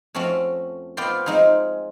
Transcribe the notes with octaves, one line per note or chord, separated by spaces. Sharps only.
F2 A3 C4 C#4 F#4
B3 C4 F4 D5 G5 C6
G#3 C4 D#4 F4 G#4